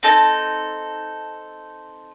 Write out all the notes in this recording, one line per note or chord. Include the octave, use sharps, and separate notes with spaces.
C4 D#4 A4 A5